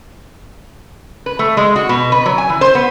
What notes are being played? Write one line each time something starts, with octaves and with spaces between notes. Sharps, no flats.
B4
A3
G#3
F#4
B2
B4
F#3
G#5
E3
C5
B3